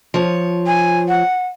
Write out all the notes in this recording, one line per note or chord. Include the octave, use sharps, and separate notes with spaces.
F3 C#5
G#5
F#5